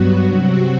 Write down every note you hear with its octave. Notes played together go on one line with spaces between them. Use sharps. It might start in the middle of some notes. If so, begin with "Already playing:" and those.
Already playing: G2 F#3 B3 F#4
C3 F#3 C4 F#4